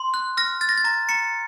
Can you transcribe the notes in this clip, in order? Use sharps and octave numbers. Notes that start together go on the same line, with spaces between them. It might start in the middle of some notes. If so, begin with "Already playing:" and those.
Already playing: C6
F#6
F6 A#6
F6 A6
A#6
A6
A#5 A#6
A#5 C#7